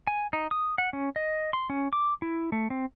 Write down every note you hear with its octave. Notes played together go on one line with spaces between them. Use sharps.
G#5
D#4
D#6
F#5
C#4
D#5
C6
C#4
D6
E4
A3
C4